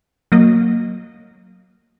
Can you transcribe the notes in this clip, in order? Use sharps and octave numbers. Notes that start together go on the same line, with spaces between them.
F#3 A#3 D#5